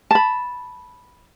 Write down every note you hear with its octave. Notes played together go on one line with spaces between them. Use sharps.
A5 B5